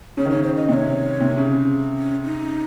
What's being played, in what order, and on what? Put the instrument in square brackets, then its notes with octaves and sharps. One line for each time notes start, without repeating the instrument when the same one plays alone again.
[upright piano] C#3 [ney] C#5
[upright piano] D#3
[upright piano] C#3 [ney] C#5
[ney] C5
D#5
[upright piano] C3 [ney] D#5
[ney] C#5
[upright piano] C3
C#3
C#3
[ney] C#4
D#4